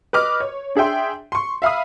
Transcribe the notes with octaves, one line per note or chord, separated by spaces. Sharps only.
B4 D#5 D6 F6
C#5
D4 G#4 E5 G5 C6
C6 C#6
E5 F5 B5 D#6